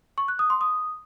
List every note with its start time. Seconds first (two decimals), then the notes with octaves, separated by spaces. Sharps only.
0.18 C#6
0.28 F#6
0.39 D#6
0.50 C6
0.61 D#6